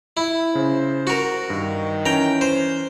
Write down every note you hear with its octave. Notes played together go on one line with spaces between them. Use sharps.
E4
C#3 C5
F#4 A#4
G2 D#3
E3 C#4 G5 A#5
C5